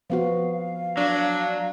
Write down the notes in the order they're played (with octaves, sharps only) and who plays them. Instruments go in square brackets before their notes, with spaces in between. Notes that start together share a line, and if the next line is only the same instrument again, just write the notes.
[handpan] F3 B3 F#4 [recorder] F5
[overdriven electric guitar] F#3 [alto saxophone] D4